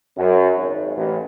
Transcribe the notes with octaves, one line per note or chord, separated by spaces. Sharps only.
F#2
G#1
A1